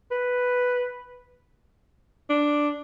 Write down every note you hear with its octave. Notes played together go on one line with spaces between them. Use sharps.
B4
D4